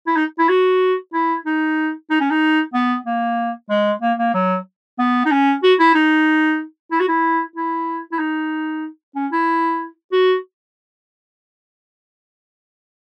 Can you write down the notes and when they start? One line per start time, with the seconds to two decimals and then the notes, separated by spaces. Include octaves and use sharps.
0.07 E4
0.17 D#4
0.39 E4
0.49 F#4
1.13 E4
1.46 D#4
2.10 D#4
2.20 C#4
2.30 D#4
2.74 B3
3.06 A#3
3.70 G#3
4.02 A#3
4.18 A#3
4.34 F#3
4.99 B3
5.25 D#4
5.31 C#4
5.63 F#4
5.79 E4
5.95 D#4
6.92 E4
7.00 F#4
7.08 E4
7.56 E4
8.12 E4
8.19 D#4
9.15 C#4
9.32 E4
10.12 F#4